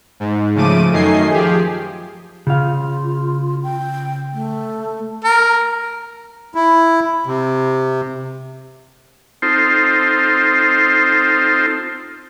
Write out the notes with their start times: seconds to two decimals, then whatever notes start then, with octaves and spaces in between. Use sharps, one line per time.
0.20 G#2
0.55 C#3 F3 A3 D6 D#7
0.92 F#2 D#3 A3 D#5 G#5 C7
1.31 F3 G4 G#4
2.47 C#3 F4 F5
3.63 G5
4.33 A3
5.24 A#4
6.55 E4
7.26 C3
9.42 C4 D#4 F4 A4 C5